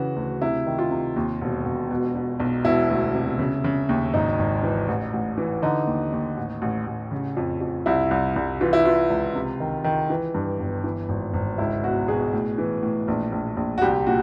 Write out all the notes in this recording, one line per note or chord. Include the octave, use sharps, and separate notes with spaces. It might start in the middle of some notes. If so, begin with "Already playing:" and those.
Already playing: C#3 E3 F#4
D2
C3 E4
D#3
F4
C3
D#2
E1
E1
B2
B2
B1
E1 E4
D2
C3
C#3
C#3
D#2
G#1 D#4
G#1
E3
A1
A1
E3
D3 D#4
D#2
D#2
A1
A1
A1
C#3
F2
F2
C2 E4
C2
C2
E3 F4
E4
E3 F4
C#2
C3
D#3
D#3
E3
G2
G1
E3
G#1
G#1
C#2 E4
B2 F#4
B2 G#4
A2
E3
A2
A#1
A#1
A#1
F#4
C2 G4
A#2 F#4